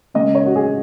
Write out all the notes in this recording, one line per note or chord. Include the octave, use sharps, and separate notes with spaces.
C#3 G#3 C#4 D#5
C#5
F#4
G#4